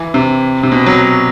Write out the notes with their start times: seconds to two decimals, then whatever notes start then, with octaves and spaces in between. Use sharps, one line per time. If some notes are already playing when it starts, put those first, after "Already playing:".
Already playing: E3
0.14 C3
0.63 C3
0.72 B2
0.86 F#3